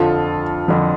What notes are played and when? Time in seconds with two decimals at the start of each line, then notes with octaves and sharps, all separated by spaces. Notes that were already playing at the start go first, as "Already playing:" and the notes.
Already playing: F2 D3 F3 F4 A4
0.68 F2 D3 F3